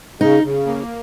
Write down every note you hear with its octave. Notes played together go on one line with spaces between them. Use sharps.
C#3 D#4
C#3
A#3